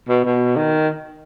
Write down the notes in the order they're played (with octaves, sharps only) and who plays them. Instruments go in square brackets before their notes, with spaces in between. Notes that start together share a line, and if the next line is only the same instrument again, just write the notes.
[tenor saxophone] B2
B2
D#3